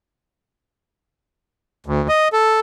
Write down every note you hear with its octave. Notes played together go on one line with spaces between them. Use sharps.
D2
D#5
A4